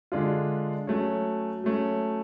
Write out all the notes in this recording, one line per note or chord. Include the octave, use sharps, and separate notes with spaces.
D3 G#3 D4 F4
F#3 A3 C#4
F#3 A3 C#4